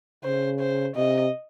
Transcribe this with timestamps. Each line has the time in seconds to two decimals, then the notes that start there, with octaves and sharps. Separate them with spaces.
0.24 C#3 C5
0.60 C5
0.96 C3 D#5